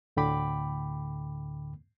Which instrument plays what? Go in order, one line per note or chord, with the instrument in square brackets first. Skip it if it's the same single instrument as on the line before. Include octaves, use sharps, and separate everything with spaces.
[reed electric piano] D2 A2 D3 G5 B5 D6